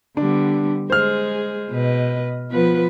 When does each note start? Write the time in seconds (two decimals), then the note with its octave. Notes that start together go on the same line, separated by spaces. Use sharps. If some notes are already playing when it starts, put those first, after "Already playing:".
0.17 D3 G3 B3 D4
0.90 G#3 G#4 C5 F6
1.70 B2 B4 D#5
2.50 F3 B3 B4